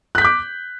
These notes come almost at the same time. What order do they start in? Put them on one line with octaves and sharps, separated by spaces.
F#6 B6 G6 D6